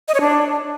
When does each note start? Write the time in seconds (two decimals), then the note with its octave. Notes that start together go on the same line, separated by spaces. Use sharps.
0.08 D#5
0.14 C#5
0.21 D4